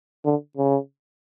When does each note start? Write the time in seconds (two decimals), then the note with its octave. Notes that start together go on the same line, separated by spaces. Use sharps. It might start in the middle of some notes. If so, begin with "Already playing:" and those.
0.25 D3
0.57 C#3